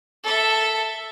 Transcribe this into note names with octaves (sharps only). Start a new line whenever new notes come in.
A4 E5